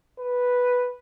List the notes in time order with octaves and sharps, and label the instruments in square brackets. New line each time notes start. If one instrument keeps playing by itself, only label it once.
[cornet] B4